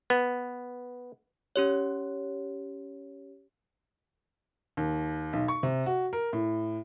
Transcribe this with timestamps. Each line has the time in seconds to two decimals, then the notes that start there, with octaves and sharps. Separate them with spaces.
0.10 B3
1.56 C#4 G4 C#5
4.77 D#2
5.33 B1
5.48 C#6
5.63 C3
5.86 F#4
6.13 A#4
6.33 A2